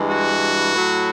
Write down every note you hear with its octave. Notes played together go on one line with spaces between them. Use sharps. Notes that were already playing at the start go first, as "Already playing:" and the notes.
Already playing: G2 E3 G#3
F#4
A2 F#3